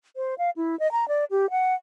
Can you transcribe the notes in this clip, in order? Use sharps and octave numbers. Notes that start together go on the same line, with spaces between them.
C5
F5
E4
D#5
A#5
D5
G4
F#5